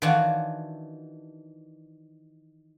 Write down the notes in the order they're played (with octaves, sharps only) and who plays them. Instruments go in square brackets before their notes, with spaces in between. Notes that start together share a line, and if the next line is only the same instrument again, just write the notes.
[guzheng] D#3 E3 D4 F4 F#4 C#5